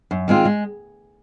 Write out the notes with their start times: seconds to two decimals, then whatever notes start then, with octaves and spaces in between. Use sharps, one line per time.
0.11 F#2
0.28 D#3 G#3 C4 F4
0.45 G#3